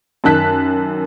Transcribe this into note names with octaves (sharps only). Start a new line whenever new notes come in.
F#2 D#3 A5 F#6 B6